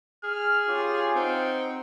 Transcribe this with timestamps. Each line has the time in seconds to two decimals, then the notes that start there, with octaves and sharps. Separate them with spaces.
0.24 G#4 F6
0.68 C#4 F4 G4
1.15 C4 D#4 F#5 G5